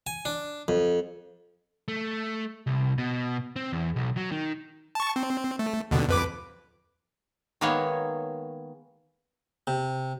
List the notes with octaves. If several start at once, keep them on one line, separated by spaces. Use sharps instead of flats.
G#5
D4
F2
A3
C2
B2
C4
E2
B1
F#3
D#3
A5 C#6
C4
A3
D#2 B2 D3
F2 B4 D6
D#3 G#3 A#3 B3 G#4 C#5
C3